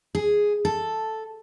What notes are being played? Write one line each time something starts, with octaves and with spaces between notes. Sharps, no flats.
G#4
A4